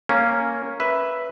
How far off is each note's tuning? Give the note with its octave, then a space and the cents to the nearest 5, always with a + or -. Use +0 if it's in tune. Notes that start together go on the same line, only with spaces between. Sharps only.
A#3 -5 C#4 +0
B4 +0 E5 +0